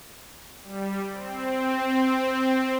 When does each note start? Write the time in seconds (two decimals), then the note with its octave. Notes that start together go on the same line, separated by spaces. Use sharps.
0.63 G3
1.12 C4